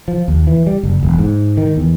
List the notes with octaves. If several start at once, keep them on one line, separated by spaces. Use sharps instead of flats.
F3
D#2
E3
G3
F#1
E1
G#2
D#3
E2